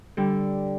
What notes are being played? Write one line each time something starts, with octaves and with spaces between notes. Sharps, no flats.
D3 G3